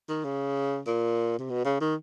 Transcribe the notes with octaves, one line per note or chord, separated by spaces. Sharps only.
D#3
C#3
A#2
C3
B2
C#3
D#3